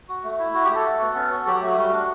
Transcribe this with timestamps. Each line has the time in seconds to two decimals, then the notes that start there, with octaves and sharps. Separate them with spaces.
0.09 F#4
0.24 A3
0.39 E4
0.54 F#4
0.65 G4
0.70 A3 A4
0.85 F#4
1.00 B3
1.15 C#4
1.31 F#4
1.46 F#3 G4
1.57 G4
1.62 A3 F#4
1.77 G3 F#4
1.92 D4